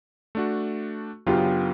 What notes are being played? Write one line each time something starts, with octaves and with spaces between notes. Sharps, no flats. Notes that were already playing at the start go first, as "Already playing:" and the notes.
A3 D4 F#4
F#2 C#3 F#3 B3 D4 F4 G4